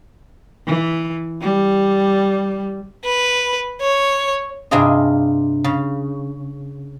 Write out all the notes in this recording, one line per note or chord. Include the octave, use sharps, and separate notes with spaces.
E3
G3
B4
C#5
G2 C3 D4 F4 G#4 D#5
C#3